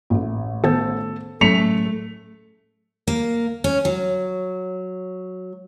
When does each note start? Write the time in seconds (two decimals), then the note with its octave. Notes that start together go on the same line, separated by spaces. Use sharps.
0.10 A1 A3
0.64 D#3 B3 A4 C5
1.41 A2 F#3 A3 C#4 B6 C#7 F7
3.07 A#3
3.64 C#4
3.85 F#3